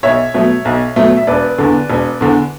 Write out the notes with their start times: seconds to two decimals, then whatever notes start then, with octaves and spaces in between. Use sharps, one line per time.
0.03 B1 C#5 E5
0.34 B2 F#3 A3
0.65 B1
0.96 B2 F#3 A3
1.17 E5
1.27 E1 B4 D5
1.58 E2 D3
1.90 E1
2.21 E2 D3